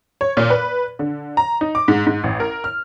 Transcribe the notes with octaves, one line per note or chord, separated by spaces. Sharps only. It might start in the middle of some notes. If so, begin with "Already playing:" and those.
C#5
A#2
B4
D3
A#5
D#4
D6
G#2
G#2
A1
A#4
F6